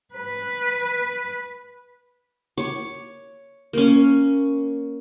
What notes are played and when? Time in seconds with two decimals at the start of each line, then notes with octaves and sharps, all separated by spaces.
0.14 B4
2.58 C#5 D6
3.73 A#3 C#4